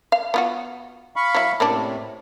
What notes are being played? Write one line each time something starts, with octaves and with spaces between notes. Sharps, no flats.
F5
B3 F4 F#4
F5 B5 C#6
F#3 E4
A2 C3 A#3 C#4 D4